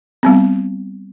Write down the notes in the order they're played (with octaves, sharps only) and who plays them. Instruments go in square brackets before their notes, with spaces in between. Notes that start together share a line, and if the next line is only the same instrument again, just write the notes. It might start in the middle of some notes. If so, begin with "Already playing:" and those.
[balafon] G3 B3 C4